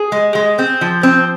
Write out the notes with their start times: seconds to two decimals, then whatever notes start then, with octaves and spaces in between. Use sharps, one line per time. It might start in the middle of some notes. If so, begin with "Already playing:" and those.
Already playing: G#4
0.12 G#3
0.35 G#3
0.59 C4
0.81 F3
1.03 C4